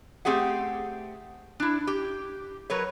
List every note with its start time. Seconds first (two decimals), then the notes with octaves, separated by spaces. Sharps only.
0.25 A3 C4 G4 G#4 F#5
1.60 D4 E4
1.87 G4
2.70 F#3 A#4 B4 C#5